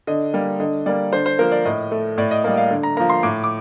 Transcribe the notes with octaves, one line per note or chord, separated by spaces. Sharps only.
D3 D#5
G3 A#3
D3 D#5
G3 A#3 D5
D3 C5
C5
F3 A#3 A#4
D5
A2 D#5
A3
A2 D5
D#5
G3 A#3 D#5
F5
D3
A#5
F3 A#3 A#5
C6
A2 D6
D6